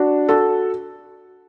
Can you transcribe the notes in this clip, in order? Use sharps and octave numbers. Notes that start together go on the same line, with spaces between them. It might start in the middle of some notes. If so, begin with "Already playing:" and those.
Already playing: D4 F#4
F#4 A4